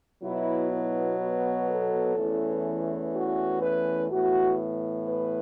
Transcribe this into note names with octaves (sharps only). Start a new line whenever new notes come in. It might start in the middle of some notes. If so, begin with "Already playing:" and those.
B2 F#3 B3 E4
E4
F#4
A4
E2 E3 A3 C#4
F#4
B4
A2 E3 B3 F#4
B4